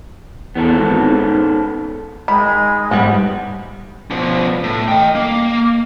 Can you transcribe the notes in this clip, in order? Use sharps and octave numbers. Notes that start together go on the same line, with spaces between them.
E2 B3 C#4 A4
G#1
G#2
D#3 G#3 B5
G#2 G3 B3 F#5
B2 F3
A2
D#5 G5
A#3